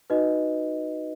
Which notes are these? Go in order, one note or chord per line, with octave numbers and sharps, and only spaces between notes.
D#4 F#4 B4 D#5